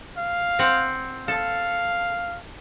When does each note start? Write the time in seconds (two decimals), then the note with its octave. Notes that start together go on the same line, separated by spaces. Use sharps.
0.17 F5
0.59 C4 F#5
1.28 A4 F5